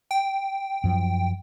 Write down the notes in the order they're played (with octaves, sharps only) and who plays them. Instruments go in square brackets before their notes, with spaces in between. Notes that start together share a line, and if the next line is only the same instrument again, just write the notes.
[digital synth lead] G5
[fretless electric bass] F#2 F3